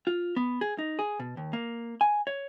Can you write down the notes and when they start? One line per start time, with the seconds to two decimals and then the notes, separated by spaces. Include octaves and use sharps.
0.07 F4
0.36 B3
0.61 G#4
0.79 D#4
0.99 G#4
1.20 B2
1.37 D#2
1.53 A#3
2.01 G#5
2.27 C#5